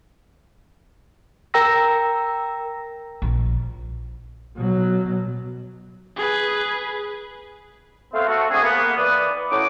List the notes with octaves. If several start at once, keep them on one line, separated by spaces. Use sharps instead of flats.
A#4 G5 A#5 E6 A#6
A#1
B2 F#3
G#4 B4
A3 B3 C4 F5
A3 F#4
A3 C4 D4 F#4 G#4
A#3 B3
E3 B4 D5 D#6
A2 C#4 D#4 F#4 C#5 D6